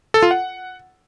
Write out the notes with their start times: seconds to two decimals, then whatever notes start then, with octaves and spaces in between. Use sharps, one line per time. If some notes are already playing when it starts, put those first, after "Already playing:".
0.14 A4
0.23 F4
0.31 F#5